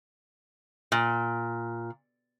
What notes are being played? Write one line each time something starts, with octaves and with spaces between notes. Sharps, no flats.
A#2